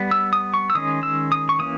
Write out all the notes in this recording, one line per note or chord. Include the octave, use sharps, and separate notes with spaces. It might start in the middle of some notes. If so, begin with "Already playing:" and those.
Already playing: G3 B3
E6
D#6
C#6
E6
D#3 G#3 C#4 D#6
E6
D#6
C#6
E3 A#3 C#4 D#6